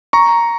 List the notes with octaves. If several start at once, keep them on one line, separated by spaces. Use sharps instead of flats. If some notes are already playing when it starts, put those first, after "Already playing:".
A#5 C#6